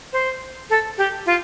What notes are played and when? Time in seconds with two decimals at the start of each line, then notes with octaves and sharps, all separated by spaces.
0.13 C5
0.70 A4
0.98 G4
1.26 F4